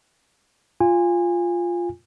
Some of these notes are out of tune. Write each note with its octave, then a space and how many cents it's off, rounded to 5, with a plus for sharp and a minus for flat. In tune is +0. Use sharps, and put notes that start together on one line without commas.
F4 +0 G#5 -25